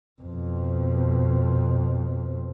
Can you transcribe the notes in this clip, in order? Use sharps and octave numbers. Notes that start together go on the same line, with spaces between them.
F2 B2